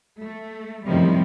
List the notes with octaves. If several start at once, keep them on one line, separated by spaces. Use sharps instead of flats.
A3
F#2 A2 C3 D#3 F3 G3